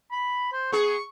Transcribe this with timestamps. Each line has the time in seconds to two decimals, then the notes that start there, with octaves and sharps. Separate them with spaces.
0.12 B5
0.53 C5
0.72 B3 G#4 C#6